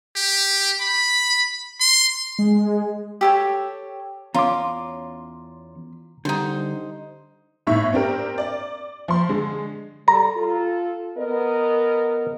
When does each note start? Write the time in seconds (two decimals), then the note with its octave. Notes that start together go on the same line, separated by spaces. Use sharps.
0.16 G4
0.81 B5
1.81 C6
2.39 G#3
3.21 G4 A4 C#5
4.34 E2 C#4 F4 A#5 C6 D6
6.25 D3 G3 D#4 C5
7.67 G1 A2 D#4 E5 C#6
7.93 C4 D4 G4 A#4
8.38 D5
9.08 F3 C6
9.29 D3 G#3
10.08 G3 A4 A#5
10.37 F4 A4
11.18 B3 A#4 D#5